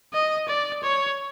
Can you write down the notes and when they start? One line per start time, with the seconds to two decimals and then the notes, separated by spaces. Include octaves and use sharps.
0.13 D#5
0.48 D5
0.83 C#5